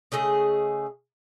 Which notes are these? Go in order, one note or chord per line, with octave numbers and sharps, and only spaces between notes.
C#3 A3 G#4 D#5